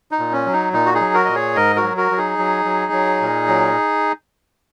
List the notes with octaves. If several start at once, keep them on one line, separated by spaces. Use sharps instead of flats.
D#4
A#2
C#4
F#3
D#4
A#2 D#4
F#4
D#4 G#4
F#3
F#4 A#4
A#2 D#5
G#4 C#5
G#2 A#4 D#5
F#4 A#4
F#3
F#4 A#4
F#3
D#4 G#4
F#3
F#3
F#3
A#2
F#3